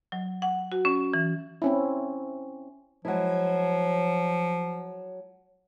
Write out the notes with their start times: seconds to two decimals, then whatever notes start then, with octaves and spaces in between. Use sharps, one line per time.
0.12 F#3
0.42 F#5
0.72 F#4
0.85 C#4
1.14 E3
1.62 C4 C#4 E4
3.05 F3 F#3 G#3 E4